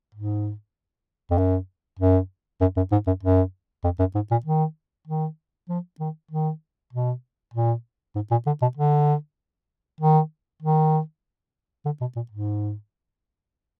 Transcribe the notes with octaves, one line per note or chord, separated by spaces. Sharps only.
G#2
F2
F#2
F#2
F#2
F#2
G#2
F#2
F#2
F2
F#2
G#2
A#2
D#3
D#3
F3
D#3
D#3
B2
A#2
G#2
A#2
D3
B2
D3
D#3
D#3
D3
B2
A#2
G#2